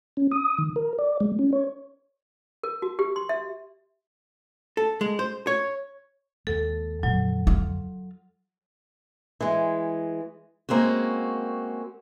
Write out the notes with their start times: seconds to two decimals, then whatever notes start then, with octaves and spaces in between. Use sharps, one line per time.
0.17 C#4
0.32 D#6
0.58 D#3
0.76 A#4
0.99 D5
1.20 G#3
1.39 C#4
1.53 C#5
2.63 A#4
2.82 F#4
2.99 G4
3.16 C6
3.29 E5
4.77 A4
5.01 G#3
5.19 C5
5.47 C#5
6.47 D#2 G#3 A4
7.03 F2 A#2 D3 F#3
7.47 F4
9.41 E3 G#3
10.69 G#3 A#3 C4 C#4 F#4